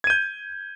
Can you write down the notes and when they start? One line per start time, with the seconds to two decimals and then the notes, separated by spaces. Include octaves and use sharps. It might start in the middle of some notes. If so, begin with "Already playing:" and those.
0.04 G#6
0.07 D#7
0.10 G6